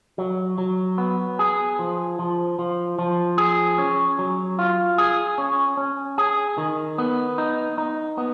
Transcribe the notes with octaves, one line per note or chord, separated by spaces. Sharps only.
F#3
F#3
B3
G#4
F3
F3
F3
F3
G#4
C#4
F#3
F4
G#4
C#4
C#4
G#4
D#3
B3
D#4
D#4
B3